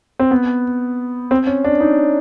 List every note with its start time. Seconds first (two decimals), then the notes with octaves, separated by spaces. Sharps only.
0.19 C4
0.31 B3
1.31 C4
1.47 C#4
1.64 D4
1.80 D#4